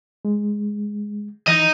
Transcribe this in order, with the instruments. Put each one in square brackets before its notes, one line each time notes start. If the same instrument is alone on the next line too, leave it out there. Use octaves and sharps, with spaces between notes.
[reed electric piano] G#3
[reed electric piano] E3 [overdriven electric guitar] D#4 D#5